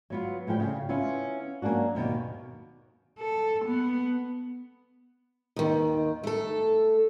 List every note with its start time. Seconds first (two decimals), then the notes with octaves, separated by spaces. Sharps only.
0.10 F#3 B3 F4
0.47 A2 F3 G3 G5
0.60 C#3
0.89 B3 C#4 E4 F4
1.62 F#3 A#3 C#4 D4 F#4
1.95 D#2 B2 D3 D#3
3.19 A4
3.66 B3
5.56 D#2 D#3
6.24 A3 A4